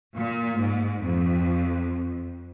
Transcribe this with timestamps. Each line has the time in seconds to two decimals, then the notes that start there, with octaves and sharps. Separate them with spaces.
0.16 A#2
0.60 G#2
1.02 F2